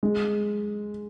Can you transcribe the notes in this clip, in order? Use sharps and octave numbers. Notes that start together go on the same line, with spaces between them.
G#3